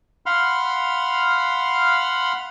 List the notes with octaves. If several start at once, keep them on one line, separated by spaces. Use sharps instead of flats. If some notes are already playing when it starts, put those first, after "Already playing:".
F5 F#5 B5 C6 F6